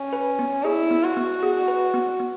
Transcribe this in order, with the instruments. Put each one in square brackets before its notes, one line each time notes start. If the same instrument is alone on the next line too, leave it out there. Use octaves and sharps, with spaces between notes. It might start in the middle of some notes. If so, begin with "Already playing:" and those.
Already playing: [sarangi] C#4
[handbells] B4
B3
[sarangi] E4 [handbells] G#4
[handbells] B3
[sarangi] F#4
[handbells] B3
G#4
B4
B3
B3